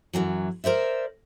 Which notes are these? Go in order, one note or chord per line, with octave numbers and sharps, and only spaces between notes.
F#2 B2 E3 F#3
A#4 C5 D5 E5